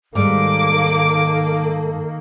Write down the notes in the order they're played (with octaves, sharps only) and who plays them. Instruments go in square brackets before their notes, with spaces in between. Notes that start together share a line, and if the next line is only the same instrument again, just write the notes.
[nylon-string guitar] G#2 G3 [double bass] D#3 A#3 [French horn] A4 [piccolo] D6